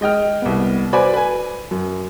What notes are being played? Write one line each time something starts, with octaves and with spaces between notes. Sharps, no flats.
G#3 D#5 G5 F6
C2 B3
F#4 B4 C5 D5 G#5 B5
B4 G#5
F#2